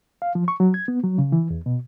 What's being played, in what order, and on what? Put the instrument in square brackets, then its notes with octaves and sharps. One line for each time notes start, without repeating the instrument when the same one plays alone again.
[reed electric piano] F5
F3
C#6
F#3
G#6
B3
F#3
C#3
E3
E2
B2